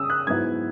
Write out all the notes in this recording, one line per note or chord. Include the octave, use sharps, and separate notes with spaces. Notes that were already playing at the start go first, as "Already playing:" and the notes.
Already playing: C#3 D#6 E6
F#6
G#2 F#3 B3 E4 G#6